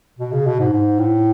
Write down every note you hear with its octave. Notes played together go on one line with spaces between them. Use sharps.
B2
C#3
B2
G#2
G#2
A2